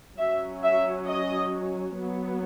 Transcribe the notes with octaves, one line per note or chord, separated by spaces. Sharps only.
F#3 C#4 E5
E5
D#5
F#3 B3